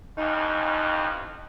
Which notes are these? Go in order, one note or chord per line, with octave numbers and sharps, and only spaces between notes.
A1 F2 D#4